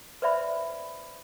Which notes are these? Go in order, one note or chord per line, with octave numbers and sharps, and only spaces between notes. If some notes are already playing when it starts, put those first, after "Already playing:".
B4 C5 D5 E5 B5